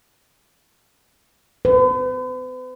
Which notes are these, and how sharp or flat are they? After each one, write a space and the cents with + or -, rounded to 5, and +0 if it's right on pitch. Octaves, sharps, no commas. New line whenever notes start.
B4 +45